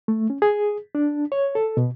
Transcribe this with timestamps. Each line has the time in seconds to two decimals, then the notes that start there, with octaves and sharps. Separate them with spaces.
0.08 A3
0.30 C#4
0.42 G#4
0.95 D4
1.32 C#5
1.55 A4
1.77 B2